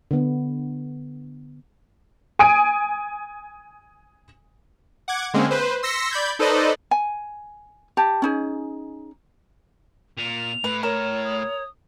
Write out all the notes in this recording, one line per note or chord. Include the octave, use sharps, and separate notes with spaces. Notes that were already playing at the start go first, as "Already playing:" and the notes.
D3 B3
G#5 D#6 D7
F#5 D6 G#6
D3 G#3 A#3 C4 C#4
B4 C5
C6 E6 A#6 B6 C#7
D5 B5 G6 G#6
D#4 A4 B4 C5 D5 D#5
G#5
G4 A5
C#4 D#4 G#4
A#2 F7
A2 B4
A#4 C#5 E7
D#6